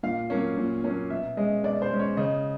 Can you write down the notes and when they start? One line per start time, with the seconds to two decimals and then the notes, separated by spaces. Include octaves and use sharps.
0.03 A#2 F5
0.30 F#3 A#3 C#4
0.57 A#2
0.84 F#3 A#3 C#4
1.10 B2 E5
1.37 G#3 C#4 D#5
1.64 B2 D5
1.82 C5
1.91 G#3 C#4
1.99 C#5
2.17 C#3 D#5